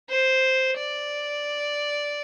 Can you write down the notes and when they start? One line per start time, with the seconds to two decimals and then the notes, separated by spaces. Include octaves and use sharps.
0.10 C5
0.77 D5